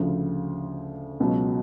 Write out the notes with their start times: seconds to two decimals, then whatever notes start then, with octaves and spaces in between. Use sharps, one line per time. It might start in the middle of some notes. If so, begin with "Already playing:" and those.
Already playing: D2 C#3 F3
1.20 C#2 B2 F#3